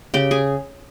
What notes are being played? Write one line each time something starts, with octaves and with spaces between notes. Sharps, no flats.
C#3 G4 G5
G#4 G#5